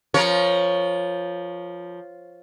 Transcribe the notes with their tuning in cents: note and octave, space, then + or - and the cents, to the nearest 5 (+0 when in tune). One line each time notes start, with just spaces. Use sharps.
F3 +0 A#4 +30 C#5 +0